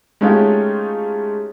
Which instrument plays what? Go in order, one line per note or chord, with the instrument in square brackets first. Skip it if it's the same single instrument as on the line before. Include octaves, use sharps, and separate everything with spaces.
[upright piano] G#3 A3 C#4 D#4 F4 G4